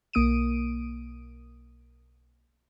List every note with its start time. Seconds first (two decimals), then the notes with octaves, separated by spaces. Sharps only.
0.13 B1 A#3 D#6 D7 D#7